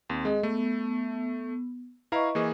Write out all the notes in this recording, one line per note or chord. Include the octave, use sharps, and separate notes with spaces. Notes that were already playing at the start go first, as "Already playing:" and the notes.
D#2 C4
G#3 G#4 D#5
A3 B3
E4 B4 D#5 F5 A#5 C#6
E3 A#3 G#4